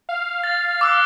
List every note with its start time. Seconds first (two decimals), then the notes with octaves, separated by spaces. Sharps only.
0.09 F5
0.44 A6
0.81 D6 E6 F#6